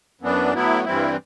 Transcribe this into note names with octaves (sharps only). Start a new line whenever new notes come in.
F#2 E3 B3 D4
A2 F#3 B3 E4
G2 E3 G3 C4 E4